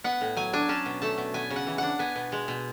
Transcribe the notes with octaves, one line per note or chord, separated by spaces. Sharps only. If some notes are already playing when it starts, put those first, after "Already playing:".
B3 F#5
A2
F#3 G#5
D4 G#5
C#4 A5
B2
A3 A5
B2
B3 G#5
C#3
F#5
E3
D4 F#5
B3 G#5
B2
G#3
B2